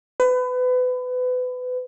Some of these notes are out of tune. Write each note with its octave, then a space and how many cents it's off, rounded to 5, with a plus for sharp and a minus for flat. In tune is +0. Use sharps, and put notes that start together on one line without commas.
B4 +30